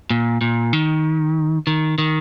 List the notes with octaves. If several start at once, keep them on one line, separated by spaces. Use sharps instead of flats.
A#2
A#2
D#3
D#3
D#3